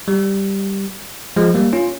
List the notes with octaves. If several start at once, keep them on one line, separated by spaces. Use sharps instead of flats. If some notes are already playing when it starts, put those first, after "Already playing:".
G3
F3 G#3
G3 A#3
C#4 F4